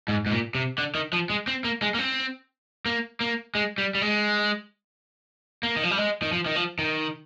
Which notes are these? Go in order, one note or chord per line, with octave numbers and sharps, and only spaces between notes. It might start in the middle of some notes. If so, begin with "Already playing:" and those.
G#2
G#2
A#2
C3
D3
D#3
F3
G#3
C4
A#3
G#3
A#3
C4
A#3
A#3
G#3
G3
G3
G#3
A#3
D#3
F3
G3
G#3
D#3
F3
D#3
F3
D#3